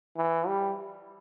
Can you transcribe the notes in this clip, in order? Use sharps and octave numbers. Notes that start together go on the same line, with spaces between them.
E3
G3